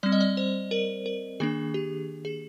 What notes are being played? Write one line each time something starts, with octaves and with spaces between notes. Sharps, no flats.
G3 C4 D5
D#5
D5
C5
A#4
A#4
D#3 A#3 D4 G#4
G4
G#4